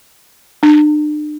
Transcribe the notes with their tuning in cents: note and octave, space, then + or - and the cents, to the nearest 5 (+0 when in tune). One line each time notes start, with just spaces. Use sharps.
D4 +40